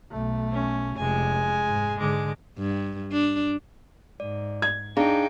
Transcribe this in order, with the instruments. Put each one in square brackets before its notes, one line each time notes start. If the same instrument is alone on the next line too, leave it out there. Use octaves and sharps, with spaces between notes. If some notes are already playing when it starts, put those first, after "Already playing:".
[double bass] B1 A3
[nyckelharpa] C#4
[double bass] F1 [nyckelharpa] G#3 G#5
[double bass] G#2
[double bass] G#2 D3 [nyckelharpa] G#3 D6
[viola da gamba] G2
D4
[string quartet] G#2 [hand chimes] D5
[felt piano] G#6
[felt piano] D4 [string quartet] D#4 G5 [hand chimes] G#4 F5 A#5